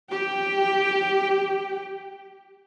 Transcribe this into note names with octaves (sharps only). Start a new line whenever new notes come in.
G4 G5